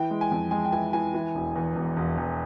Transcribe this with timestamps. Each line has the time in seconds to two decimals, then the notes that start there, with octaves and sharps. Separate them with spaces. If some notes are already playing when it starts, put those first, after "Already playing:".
Already playing: E3 G5
0.11 G#3
0.21 G#5
0.32 F2
0.51 G#3 G#5
0.65 G5
0.72 E3 G#5
0.93 E3 G#5
1.14 E3
1.35 E1
1.56 E2
1.76 E1
1.96 E1
2.17 E1